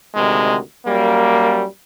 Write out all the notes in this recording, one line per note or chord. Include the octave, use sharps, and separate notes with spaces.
D2 C3 D#3 G#3
F#2 G3 A#3